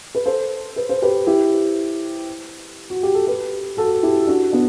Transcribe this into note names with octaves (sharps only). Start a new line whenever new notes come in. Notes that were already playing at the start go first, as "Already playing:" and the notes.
B4
A4 C5
B4
C5
G4 B4
E4 G4
F#4
G4
A4
G4 B4
F#4 A4
E4 G4
D4 F#4
B3 D4